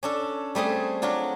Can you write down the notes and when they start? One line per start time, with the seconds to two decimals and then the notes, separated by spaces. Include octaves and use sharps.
0.03 C#4 D4 A4
0.55 G3 A3 C4 G#4
1.02 F#3 D4 F4